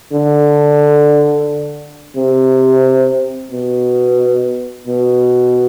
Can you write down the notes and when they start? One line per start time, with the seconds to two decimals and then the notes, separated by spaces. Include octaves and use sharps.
0.12 D3
2.16 C3
3.51 B2
4.87 B2